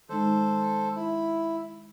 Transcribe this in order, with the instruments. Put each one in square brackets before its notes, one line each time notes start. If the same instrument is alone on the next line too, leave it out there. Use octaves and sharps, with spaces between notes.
[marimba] D#3 G#3 D#4 [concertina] A4 C5
[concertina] E4